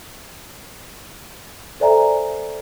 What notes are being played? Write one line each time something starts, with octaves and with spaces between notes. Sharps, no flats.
A4 C5 D5 E5 G#5 A#5